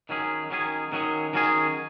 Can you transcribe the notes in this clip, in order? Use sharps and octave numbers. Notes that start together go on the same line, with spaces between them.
D#3 F#3 C#4 G#4
D#3 F#3 C#4 G#4
D#3 F#3 C#4 G#4
D#3 F#3 C#4 G#4